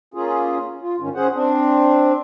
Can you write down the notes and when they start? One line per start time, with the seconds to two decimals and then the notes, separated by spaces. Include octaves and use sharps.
0.14 A#3 C#4 F4 G#4
0.82 F4
1.00 G#2 D#3 C#4
1.15 C#4 G#4 C5 F#5
1.34 C4 D4